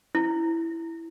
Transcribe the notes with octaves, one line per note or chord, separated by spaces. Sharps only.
E4